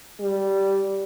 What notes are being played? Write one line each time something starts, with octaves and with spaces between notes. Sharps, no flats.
G3